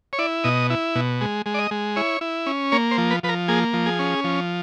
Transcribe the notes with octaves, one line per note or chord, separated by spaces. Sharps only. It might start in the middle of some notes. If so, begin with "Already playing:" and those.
C#5
E4 D5
B2 D#5
E4
B2
G#3
G#3
D5
D#5
G#3
E4 C#5
E4
C#4
A#3 C#5
C5
F3
B4
F3 B4
A#4
A#3 G#4
F3
G#4
C#4
F3